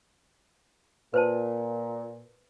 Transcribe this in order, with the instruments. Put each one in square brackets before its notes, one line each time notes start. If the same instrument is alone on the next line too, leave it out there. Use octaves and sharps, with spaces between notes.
[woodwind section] A#2 [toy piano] B4 C5 A5